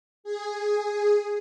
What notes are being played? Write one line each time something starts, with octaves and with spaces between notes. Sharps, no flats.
G#4